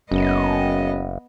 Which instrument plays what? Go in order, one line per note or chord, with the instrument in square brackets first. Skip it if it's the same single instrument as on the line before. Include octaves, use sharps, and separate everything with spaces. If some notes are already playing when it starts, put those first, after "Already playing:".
[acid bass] F#1 [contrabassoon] F#2 [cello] B3 D#5